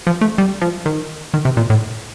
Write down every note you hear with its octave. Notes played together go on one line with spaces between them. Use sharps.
F3
A3
G3
F3
D#3
D#3
C3
A#2
A2